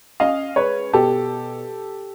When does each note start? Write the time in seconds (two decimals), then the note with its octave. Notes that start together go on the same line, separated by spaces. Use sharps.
0.20 C#4 D#5 F5
0.56 G#3 B4 C#5
0.93 B2 G4 A4